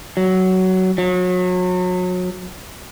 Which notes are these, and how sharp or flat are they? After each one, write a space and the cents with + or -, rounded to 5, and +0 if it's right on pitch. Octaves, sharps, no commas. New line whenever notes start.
F#3 +15
F#3 -30